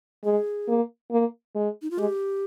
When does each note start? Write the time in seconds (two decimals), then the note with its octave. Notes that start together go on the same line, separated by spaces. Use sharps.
0.24 G#3 G#4
0.68 A#3
1.11 A#3
1.55 G#3
1.82 D#4
1.91 F4
1.98 G#3 G4